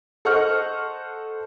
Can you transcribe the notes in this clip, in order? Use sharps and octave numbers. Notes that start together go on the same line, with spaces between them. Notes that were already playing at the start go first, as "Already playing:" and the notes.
A4 C5 D#5 F#5 C#6 F6